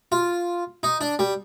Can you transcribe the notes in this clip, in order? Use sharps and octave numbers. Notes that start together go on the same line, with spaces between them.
F4
D#4
D4
G3